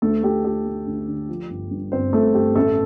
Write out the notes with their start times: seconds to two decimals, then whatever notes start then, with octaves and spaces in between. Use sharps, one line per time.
0.02 D2 A3 A4
0.23 A3 G4
0.44 D3 G4
0.66 A3
0.87 D2
1.08 D3
1.29 F3
1.50 G1
1.71 G2
1.92 G1 C4 C5
2.13 G1 A3 A4
2.34 G1 G4
2.55 A1 A3 A4